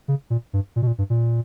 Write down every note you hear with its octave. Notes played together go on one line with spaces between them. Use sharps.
C#3
A#2
G2
A#2
B2
A#2
G2
A#2